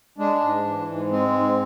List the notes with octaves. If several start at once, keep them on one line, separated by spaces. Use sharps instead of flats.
G#3 D4
G#2
E3
G#2
G#3 C4
G#2